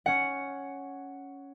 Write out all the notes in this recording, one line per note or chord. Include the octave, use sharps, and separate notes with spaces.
C#4 F#5